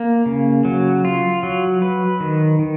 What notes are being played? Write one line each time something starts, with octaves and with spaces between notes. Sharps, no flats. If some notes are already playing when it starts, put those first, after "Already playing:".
Already playing: A#3
C#3
F#3
F4
F#3
B4
D#3
D#3